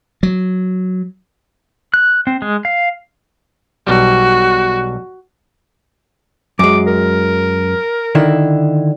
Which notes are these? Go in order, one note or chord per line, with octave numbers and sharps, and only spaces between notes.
F#3
F#6
C4
G#3
F5
B1 G3 F#4
F#2 G#3 D6
A#4
D3 D#3 E4